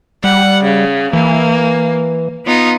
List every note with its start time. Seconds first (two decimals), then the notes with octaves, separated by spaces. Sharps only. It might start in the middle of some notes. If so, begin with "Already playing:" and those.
0.24 G3 F#5
0.64 C#3
1.13 E3 A#3
2.45 B3 D#4 F4